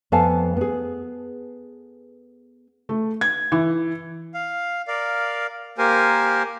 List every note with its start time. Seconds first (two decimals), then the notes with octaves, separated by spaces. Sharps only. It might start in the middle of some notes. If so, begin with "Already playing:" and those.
0.12 F2 B3 A4 F5 G#5 A5
0.57 B3 G#4
2.89 A3
3.21 G#6
3.52 E3
4.34 F5
4.88 A#4 D5 F5
5.78 A#3 G4 A#4 C5 G#5